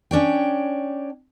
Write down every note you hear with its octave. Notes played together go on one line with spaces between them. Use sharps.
C#4 D4 C#5 G5